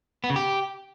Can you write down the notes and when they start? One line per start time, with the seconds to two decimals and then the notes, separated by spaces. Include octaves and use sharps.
0.24 B3
0.30 C#3
0.36 G4